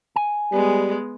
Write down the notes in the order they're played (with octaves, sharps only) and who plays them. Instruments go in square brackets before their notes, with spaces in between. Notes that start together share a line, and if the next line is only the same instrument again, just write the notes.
[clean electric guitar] G#5
[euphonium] G3 [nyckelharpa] G#3 B3